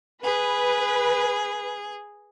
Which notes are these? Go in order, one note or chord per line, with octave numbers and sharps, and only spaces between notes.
G#4 B4